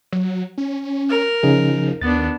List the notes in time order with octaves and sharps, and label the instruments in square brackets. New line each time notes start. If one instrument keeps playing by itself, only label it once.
[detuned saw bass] F#3
C#4
[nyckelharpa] A#4
[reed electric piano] C#3 D#4 G#4 [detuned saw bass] F3
[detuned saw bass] D#2 [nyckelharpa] B3 D4 [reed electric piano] A6